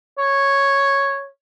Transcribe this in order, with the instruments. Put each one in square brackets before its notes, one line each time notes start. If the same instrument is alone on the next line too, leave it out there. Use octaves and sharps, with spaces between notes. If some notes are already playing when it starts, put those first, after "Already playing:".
[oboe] C#5